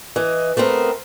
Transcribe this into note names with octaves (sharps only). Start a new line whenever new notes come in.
E3 D#5
A3 B3 C4 A#4